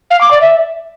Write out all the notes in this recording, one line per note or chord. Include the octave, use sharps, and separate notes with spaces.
F5
D6
D5
E5